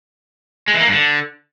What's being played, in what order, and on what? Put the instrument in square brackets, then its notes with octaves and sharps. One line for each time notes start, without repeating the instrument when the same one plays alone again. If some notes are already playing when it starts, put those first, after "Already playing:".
[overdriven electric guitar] G#3
E3
A#3
G2
D3